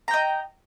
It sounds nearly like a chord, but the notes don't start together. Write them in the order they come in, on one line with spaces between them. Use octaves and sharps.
A#5 G5 D#5